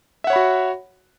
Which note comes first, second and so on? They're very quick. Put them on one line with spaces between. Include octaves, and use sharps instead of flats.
E5 F#5 C#5 B5 F#4